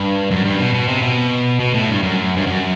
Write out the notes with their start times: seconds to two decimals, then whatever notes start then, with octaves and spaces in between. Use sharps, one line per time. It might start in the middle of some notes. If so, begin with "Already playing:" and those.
Already playing: G2
0.31 F#2
0.45 G2
0.59 B2
0.74 B2
0.88 C3
1.02 B2
1.60 B2
1.74 A2
1.89 G2
2.03 F#2
2.37 G2
2.47 F#2